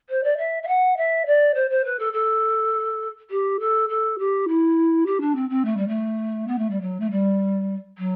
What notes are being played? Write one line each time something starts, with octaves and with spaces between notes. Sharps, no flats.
C5
D5
E5
E5
F#5
E5
D5
C5
C5
B4
A4
A4
G4
A4
A4
G4
E4
G4
D4
C4
C4
A3
G3
A3
B3
A3
G3
F#3
A3
G3
F#3